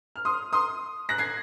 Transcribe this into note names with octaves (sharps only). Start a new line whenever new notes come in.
F6
C6 D#6
C6 D#6
F#6 A#6
G#6 C7